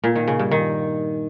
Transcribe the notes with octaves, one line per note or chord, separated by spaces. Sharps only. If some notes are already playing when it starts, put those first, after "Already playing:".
A#2
D#3
C#3
G2
D#3